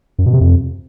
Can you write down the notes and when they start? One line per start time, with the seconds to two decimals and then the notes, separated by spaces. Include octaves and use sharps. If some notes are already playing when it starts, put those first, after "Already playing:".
0.19 F#2
0.26 B2
0.33 C3
0.41 F2